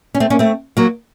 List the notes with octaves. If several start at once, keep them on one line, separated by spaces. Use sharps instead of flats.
C#4
A3 C4
A#3 C#4
A3 C4
F#3 A#3